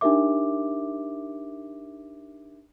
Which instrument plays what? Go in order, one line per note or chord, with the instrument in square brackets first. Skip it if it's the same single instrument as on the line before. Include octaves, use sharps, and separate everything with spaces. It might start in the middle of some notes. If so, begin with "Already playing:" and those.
[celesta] D4 D#4 G4 A#4 E5 D6